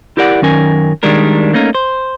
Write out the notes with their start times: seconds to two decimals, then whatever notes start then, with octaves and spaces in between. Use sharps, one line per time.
0.17 E4 G4 A#4 D5 F5 F#5
0.42 F#2 D#3 C#4 A#4 G#5
1.03 D#3 G3 G#3 D4 A#4
1.53 A3 A#3 C#4 D#4 A#4
1.75 C5